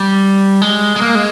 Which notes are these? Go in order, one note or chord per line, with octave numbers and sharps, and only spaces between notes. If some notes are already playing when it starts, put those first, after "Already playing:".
Already playing: G3
G#3
G#3
A#3
G#3